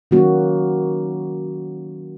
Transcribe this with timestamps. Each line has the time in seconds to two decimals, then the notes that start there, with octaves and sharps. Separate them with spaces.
0.11 D#3 F#3 A#3 C#4 F#4